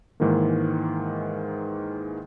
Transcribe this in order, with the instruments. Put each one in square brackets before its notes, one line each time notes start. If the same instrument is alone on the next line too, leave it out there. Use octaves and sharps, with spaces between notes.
[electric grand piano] G#2 D#3 E3 G#3 A#3